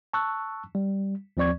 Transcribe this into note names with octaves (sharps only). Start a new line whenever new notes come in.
A5 C#6 E6 F#6
G3
D#2 F3 C4 D5 C#6 G#6